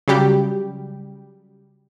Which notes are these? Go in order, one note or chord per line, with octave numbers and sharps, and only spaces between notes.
C#3 F#3 G3 G4